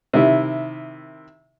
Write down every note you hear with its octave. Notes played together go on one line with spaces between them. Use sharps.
C3 D#3 E4